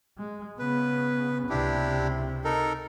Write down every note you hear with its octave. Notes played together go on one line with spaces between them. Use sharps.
G#3
C#3 B3 B4
C#2 C3 D4 E4 G4
D#4 A4 A#4